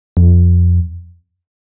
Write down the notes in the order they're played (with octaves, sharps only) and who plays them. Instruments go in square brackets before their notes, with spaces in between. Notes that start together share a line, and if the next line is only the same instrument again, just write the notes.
[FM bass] F2